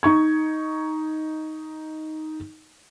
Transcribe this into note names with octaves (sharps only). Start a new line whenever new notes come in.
D#4 C#6 G#6